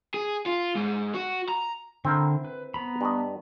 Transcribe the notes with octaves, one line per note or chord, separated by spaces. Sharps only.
G#4
F4
G#2
F#4
A#5
D3 C4 E4 A#4
B4
B3 A#5 B5
G2 D#5